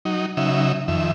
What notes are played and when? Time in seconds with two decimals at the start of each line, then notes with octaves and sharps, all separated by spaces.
0.05 F#3 D#4
0.37 C#3 F#3 D#4 E5
0.88 F2 D#3 E5